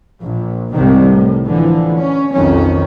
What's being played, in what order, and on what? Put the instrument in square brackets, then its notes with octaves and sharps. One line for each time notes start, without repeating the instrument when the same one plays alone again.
[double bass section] A#1
C2 G#2 C3 D#3
A2
D3 E3 F3
C#4
B1 F2 D#3 C#4